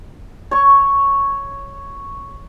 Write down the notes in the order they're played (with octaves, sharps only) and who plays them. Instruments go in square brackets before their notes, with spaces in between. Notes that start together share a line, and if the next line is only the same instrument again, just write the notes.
[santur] C#5 C#6